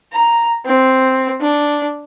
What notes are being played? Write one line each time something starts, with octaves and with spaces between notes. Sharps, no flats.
A#5
C4
D4